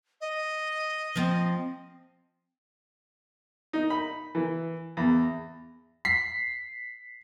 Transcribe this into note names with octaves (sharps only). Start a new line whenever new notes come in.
D#5
F3 C4
D#4
B5
E3
E2
B6 C7